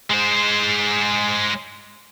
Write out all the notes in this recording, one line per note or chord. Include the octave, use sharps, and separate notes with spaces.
G#3 C5